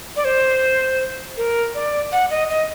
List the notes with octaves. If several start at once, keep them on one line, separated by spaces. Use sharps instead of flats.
D5
C5
A#4
D5
F#5
D#5
D#5